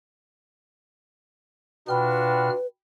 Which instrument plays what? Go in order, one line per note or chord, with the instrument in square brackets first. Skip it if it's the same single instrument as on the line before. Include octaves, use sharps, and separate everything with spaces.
[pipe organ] B2 F6 [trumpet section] D4 F4 F#4 [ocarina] B4 [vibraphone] G5 B5